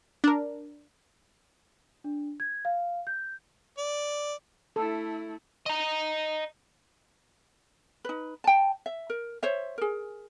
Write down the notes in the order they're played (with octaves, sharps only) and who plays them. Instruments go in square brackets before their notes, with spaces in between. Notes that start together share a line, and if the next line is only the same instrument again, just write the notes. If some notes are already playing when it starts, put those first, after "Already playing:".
[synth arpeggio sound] D4 A#4
[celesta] D4
G#6
F5
G6
[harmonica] D5
[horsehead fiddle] A3 E4 [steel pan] A4
[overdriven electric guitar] D#5 A#5
[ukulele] D#4 B4
G5 A5
E5
A#4
C5 C#5 E5
G#4 A#4